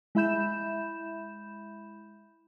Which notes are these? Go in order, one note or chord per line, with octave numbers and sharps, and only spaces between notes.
G#3 E4 E5 B5 G6 E7